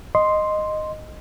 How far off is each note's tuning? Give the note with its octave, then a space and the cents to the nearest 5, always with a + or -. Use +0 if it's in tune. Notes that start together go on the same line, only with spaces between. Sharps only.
D#5 -5 C6 +0